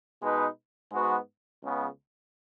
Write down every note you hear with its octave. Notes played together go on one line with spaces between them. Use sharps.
B2 G#3 D#4 B4
G#2 G#3 B3 F#4 B4
C#2 C#3 B3